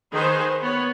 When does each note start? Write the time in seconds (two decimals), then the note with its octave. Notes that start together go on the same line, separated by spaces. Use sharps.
0.11 D#3 G#4 B4 C5
0.61 B3 C#5